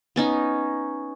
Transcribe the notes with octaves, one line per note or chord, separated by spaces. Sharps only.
B3 C#4 D#4